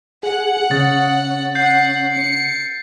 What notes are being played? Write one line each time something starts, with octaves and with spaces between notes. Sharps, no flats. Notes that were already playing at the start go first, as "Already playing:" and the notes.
G#4 F#5
C#3 C#4 A6
F#5 G6 C7
C#7